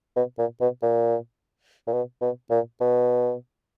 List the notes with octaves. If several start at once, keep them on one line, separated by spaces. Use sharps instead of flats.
B2
A#2
B2
A#2
A#2
B2
B2
A#2
B2